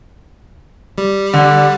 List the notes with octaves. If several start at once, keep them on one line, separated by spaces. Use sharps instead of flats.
G3
D3